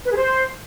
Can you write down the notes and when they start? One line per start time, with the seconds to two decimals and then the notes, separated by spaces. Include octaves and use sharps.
0.05 B4
0.11 G#4
0.17 C5